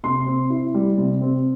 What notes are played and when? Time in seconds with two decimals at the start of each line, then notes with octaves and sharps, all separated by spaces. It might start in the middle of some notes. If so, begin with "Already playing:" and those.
0.04 C3 C6
0.26 C4
0.50 E4
0.74 G3
0.98 C3
1.21 C4